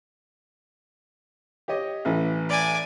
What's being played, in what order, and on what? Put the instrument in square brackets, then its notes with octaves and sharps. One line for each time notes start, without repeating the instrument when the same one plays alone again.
[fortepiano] G4 C#5 D#5
A1 E3
[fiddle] D5 G#5